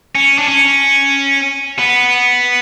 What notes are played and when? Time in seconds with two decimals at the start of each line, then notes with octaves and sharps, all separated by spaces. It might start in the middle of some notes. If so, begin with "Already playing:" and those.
0.15 C#4
0.38 D4
0.48 C#4
1.79 B3